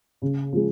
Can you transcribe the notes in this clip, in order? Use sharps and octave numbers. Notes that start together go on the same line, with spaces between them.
C#3
F3 G#3